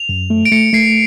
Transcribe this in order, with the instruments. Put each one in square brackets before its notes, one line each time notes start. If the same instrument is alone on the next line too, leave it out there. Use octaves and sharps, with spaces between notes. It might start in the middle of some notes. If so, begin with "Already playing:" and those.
Already playing: [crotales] F7
[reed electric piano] F#2
A3
[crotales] D7
[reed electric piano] A3 [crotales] C#7
[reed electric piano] A3 [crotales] C7